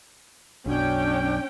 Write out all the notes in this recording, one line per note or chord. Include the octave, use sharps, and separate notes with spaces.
B1 F#2 B2 C#4 D4 G5